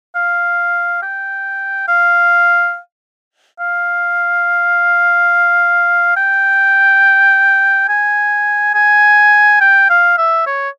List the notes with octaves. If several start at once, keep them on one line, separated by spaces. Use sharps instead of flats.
F5
G5
F5
F5
G5
G#5
G#5
G5
F5
E5
C#5